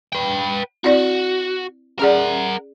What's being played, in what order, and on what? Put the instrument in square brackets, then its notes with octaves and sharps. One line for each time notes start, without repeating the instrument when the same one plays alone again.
[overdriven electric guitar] B4 G5
[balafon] C4 E4 D5 [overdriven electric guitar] F#4
[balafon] C#4 G#4 D5 [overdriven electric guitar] A#4 F#5